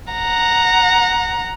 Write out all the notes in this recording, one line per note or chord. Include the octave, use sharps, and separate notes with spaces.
F#5 A#5